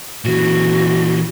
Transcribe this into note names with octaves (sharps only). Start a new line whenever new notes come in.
A#2 E3 F#4